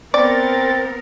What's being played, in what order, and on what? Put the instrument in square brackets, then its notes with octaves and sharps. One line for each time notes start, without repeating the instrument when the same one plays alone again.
[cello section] B3 A#4 [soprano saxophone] C4 [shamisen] D5 [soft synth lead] A6